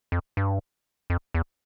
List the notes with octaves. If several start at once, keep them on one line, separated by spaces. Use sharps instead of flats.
F2
G2
F2
E2